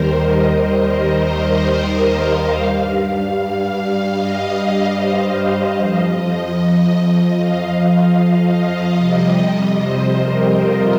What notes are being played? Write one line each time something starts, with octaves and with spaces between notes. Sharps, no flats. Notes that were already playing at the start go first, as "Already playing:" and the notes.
Already playing: D#2 D#3 G3 A#4 C5
D#5
C5
D#5
F5
G2 G3
D#5
D#5
C5
F2 F3 D#5
F5
F5
D#5
F2 C3 G3
C5
A#4
F4